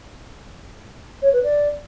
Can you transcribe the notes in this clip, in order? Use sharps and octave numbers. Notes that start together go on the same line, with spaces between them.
C#5
B4
D5